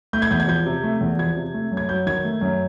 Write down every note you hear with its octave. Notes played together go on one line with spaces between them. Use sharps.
A3 G6
G#6
E2 G6
G#6
F3 G6
C3
A3
E2
F3 G#6
C3
A3
F#2
G#6
F#3 G6
D#3 G#6
A3
F#2